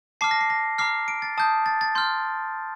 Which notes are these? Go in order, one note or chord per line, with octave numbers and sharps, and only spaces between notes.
A5 D6 F6 C7
A#6
C7
A#6
A#5 D6 F6 C7
D7
A6
A5 D#6 G6
A6
A6
C6 F6 G6